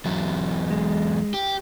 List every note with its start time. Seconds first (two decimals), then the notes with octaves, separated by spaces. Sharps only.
0.05 E2 F#3
0.70 G#3
1.34 G4